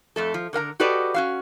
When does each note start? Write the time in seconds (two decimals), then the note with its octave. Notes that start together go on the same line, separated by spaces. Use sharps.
0.16 F2 A3 A4
0.34 F3
0.53 D3 A#4 F5 A#5
0.80 F#4 G4 A4 B4 D5 D#5
1.14 C#4 F#4 F5